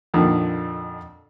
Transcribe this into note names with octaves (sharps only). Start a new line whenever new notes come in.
F2 A#2 D3 D#3